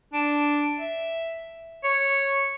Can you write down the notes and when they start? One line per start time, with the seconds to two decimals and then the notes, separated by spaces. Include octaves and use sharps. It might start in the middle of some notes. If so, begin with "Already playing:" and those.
0.13 D4
0.78 E5
1.84 C#5